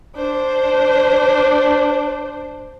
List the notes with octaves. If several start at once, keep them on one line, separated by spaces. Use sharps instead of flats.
D4 C5